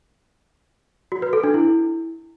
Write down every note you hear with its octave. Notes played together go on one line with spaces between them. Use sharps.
F#4
B4
A4
D4
E4